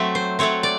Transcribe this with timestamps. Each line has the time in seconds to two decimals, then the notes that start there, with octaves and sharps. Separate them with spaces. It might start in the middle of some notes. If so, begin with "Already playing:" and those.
Already playing: F#3 A3 C4 E5
0.15 C5
0.39 F#3 A3 C4 C#5
0.63 D5